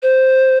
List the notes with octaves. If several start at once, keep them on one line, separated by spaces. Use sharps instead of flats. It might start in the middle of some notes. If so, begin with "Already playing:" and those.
C5